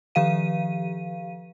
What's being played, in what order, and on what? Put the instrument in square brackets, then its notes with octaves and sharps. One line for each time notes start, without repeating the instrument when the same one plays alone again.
[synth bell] D#3 F3 G4 F5 D#7